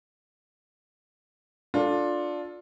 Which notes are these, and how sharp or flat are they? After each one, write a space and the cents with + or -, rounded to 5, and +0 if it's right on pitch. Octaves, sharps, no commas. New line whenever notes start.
D4 +0 F4 +15 A4 +0